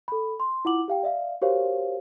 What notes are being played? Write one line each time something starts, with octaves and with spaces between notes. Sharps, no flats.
A4 B5
C6
E4 F4 F#5 D6 F#7
G4 F5 G5
D5 E5 F5
F#4 G4 A#4 C5 C#5 F5